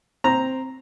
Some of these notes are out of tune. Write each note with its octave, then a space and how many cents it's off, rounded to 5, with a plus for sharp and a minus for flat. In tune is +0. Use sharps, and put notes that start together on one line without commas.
C4 +0 A#5 +0